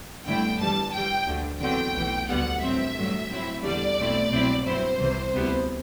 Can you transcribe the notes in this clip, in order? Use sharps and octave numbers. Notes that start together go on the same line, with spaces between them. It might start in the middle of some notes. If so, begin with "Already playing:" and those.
G1 G2 D3 A3 E4 G5
G1 G2 E3 G3 A5
G2 E3 G3 G5
D2 D3 A3
E2 D3 F#3 C4 G5
B1 A2 E3
D2 D3 G3 B3 F#5
A1 G2 F#3 C4 E5
A1 G2 F#3 A3
A2 F#3 C4 E4
E2 D3 G3 D4 D5
B1 B2 A3 C4 E4
C2 B2 F#3 C4 E4
G2 F#3 C4 E4 C5
C2 C3 E3
D2 C3 G3 B3 E4